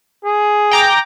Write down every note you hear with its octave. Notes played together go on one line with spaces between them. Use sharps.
G#4
G5 A#5 D6